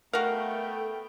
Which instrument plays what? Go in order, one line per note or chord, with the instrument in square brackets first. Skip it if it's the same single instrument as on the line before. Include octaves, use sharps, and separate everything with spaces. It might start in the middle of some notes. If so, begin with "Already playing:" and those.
[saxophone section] A3 [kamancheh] B3 G5 [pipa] F#4 F5 [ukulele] A#4